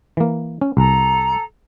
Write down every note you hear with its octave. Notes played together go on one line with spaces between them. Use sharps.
E3 A#3
C#4
C2 A4 A#5